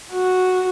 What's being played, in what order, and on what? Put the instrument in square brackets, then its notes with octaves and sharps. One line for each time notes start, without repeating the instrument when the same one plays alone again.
[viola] F#4